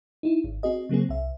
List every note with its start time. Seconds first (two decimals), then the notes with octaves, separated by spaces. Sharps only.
0.23 D#4 E4
0.44 G#1
0.63 C4 F#4 G#4 D#5
0.89 C#3 F#3 A#3 C4 G#4
1.09 C2 E5